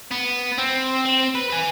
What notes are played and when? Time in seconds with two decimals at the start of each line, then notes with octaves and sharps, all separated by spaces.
0.11 B3
0.58 C4
1.05 C4
1.35 B4
1.50 B4 G#5